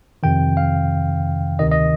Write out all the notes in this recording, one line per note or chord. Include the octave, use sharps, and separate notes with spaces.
F2 C3 D#3 G5
F5
D2 C3 D#3 D#5
D#5